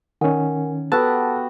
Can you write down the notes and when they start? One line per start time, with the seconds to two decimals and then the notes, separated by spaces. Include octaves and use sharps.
0.21 D#3 C#4 A#4 F#5 G#5
0.92 B3 F#4 G4 A4 A5 E6 F#6